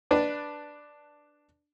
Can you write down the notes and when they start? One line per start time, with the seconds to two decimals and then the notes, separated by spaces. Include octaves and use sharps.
0.11 D4 B4 D5